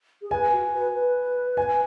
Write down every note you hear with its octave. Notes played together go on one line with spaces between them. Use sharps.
G#4
B4 G#5
F#4
B4
B4
G#5